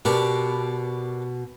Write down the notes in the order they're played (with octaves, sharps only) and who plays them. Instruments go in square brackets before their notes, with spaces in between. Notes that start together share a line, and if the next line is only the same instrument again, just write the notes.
[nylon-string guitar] B2 [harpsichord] D4 G4 A#4